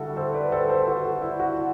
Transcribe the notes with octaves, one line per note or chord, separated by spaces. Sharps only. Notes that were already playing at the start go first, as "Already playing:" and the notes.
Already playing: D3 G3 E4 F#4 A4
A4 C5
B4 D5
A4 C5
A4 C5
F#4 A4
F#4
E4
F#4
F#4